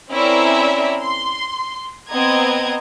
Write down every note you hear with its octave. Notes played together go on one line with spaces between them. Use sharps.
C4 C#4 E4 A#4 D5 E5
C6
B3 C4 D#5 A#5 G#6